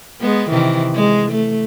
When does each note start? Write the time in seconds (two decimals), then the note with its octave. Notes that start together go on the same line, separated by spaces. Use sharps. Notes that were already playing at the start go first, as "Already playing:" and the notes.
0.21 G#3 B3
0.50 C3 D#3 E3
0.95 G#3
1.31 A3